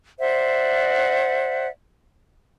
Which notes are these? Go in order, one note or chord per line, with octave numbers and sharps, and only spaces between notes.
C5 D5 E5 F#5